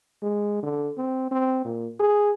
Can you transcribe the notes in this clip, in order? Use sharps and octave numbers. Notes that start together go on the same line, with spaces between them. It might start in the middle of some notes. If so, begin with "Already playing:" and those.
G#3
D3
C4
C4
A#2
G#4